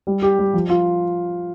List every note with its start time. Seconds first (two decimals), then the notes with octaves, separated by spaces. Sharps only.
0.07 G3
0.22 G4
0.39 G3
0.53 F3
0.70 F4